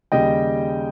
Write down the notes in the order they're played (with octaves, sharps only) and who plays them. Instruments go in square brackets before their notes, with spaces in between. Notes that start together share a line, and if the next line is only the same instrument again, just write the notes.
[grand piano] D#2 C#3 G3 D#5 G5